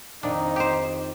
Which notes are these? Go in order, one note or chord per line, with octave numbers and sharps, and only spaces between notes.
F2 D#3 D4 D#4
G4 C5